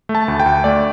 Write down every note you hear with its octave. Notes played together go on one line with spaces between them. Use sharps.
A3
A5
D2
G5
D2
A3 D5